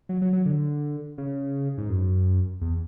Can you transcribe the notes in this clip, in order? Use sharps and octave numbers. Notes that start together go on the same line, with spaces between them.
F#3
F#3
F#3
D3
C#3
G#2
F#2
E2